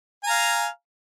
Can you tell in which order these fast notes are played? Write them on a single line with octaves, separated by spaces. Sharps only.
G#5 A#5 F5